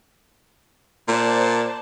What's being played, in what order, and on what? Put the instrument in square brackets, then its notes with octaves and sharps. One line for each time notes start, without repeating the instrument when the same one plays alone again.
[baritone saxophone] A#2 [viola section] C5 D5 A5